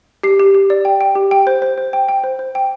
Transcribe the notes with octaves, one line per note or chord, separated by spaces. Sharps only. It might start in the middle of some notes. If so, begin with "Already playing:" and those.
G4 C7
G4
G4
D5
G5
G5
G4
G5
C5
C5
C5
G5
G5
C5
C5
G5